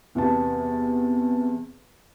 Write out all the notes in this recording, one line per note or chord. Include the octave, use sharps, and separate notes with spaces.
E2 C3 B3 A5